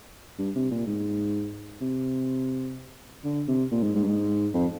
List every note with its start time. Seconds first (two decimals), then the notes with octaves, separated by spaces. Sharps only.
0.39 G2
0.55 C3
0.71 A#2
0.87 G#2
1.81 C3
3.24 D3
3.48 C3
3.72 A#2
3.83 G#2
3.95 G#2
4.03 G2
4.07 G#2
4.54 F2